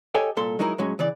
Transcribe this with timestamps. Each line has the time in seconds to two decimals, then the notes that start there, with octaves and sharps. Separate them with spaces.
0.14 G4 A4 C#5 D#5 G5 G#5
0.37 C2 A#2 A4 C6
0.59 F#3 G#3 D#4 E4 A#4
0.78 A2 F#3 G#3 C#4
0.99 C#3 E3 D5